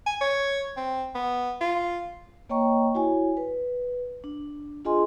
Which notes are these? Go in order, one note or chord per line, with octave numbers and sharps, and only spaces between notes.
G#5
C#5
C4
B3
F4
A#3 C#5 D#5 G5 A#5 C#6
E4 F#4 C#5 G#5
B4
D4
D4 F4 G#4 D#5 G#5 C6